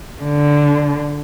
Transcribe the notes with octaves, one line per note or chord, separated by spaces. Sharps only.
D3